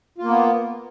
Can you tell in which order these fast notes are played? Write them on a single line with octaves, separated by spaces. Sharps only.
F4 A#3 B3